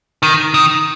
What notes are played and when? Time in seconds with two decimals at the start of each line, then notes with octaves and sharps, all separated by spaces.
0.23 D#3
0.54 D#3